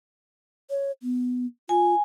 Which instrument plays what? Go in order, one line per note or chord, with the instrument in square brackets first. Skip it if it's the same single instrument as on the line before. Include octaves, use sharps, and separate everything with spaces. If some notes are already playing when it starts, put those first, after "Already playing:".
[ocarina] C#5
B3
[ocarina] F4 [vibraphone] G#5